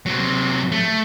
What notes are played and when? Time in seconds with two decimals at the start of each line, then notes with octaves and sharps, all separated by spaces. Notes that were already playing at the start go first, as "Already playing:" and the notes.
0.06 C3 F#3
0.72 A3